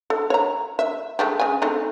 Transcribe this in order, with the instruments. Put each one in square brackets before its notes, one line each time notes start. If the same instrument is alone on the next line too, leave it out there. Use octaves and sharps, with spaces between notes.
[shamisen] A4
C#5 A#5
E5
G#3 A3 G4
C#3 G#5
A3 C4 D#4